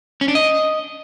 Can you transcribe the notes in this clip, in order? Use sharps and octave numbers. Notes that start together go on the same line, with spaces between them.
C#4
D4
D#5